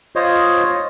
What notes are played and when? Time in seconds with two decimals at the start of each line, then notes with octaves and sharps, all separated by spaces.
0.16 F4 C5 C#5 D#5